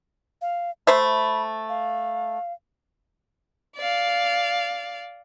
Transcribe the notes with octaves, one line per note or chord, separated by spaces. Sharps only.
F5
A3 C5 E5 B5
F5
D5 F5